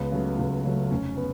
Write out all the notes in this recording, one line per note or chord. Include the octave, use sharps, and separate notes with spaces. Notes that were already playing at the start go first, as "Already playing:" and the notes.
Already playing: C#2 B3
C#3 F#3 A3
C#2
C#3 F#3 A3
F1 C#4
B3